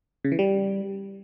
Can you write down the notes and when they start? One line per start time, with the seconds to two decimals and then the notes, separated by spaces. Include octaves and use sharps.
0.25 C#3
0.32 E3
0.39 G3